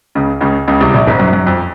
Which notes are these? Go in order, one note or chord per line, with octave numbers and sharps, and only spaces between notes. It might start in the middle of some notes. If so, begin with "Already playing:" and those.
C#2 C#3
C#2 C#3
C#2 C#3
C2 C3
A#1 A#2
G#1 G#2
F#2
F#2
F2